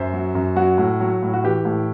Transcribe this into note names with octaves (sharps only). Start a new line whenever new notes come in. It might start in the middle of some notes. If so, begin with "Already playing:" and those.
Already playing: F#2 C5 E5
F#3
F#2
F#3 F#4
A2
F#3
A2
F#4
E3 G4
A2